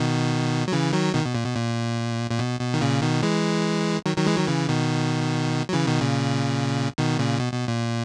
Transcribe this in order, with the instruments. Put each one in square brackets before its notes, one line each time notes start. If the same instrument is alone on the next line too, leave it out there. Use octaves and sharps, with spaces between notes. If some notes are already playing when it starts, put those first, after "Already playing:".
Already playing: [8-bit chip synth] B2 D#3
F#3
C#3 E3
D#3 F#3
B2 D#3
B2
A#2
B2
A#2
A#2
B2
B2
D#3
A#2 C#3
B2 D#3
E3 G#3
D#3 F#3
D#3 F#3
E3 G#3
D#3 F#3
C#3 E3
B2 D#3
F#3
C#3 E3
B2 D#3
A#2 C#3
B2 D#3
A#2 C#3
B2
B2
A#2